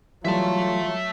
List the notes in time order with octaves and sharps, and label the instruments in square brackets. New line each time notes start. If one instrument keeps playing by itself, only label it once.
[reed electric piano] E3 G3 A3 [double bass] F#3 [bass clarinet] F4 [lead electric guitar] E5 A5